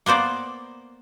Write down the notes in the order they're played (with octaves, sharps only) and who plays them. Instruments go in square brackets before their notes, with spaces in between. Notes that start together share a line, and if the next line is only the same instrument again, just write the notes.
[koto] A#3 B3 C5 D5